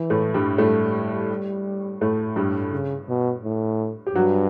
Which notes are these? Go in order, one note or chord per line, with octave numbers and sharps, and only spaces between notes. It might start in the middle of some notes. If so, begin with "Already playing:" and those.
Already playing: E3
A2 A3
G2 G3
A2 G3 A3
A2 A3
G2 G3
C#3
B2
A2
G4
G2 F#3 F#4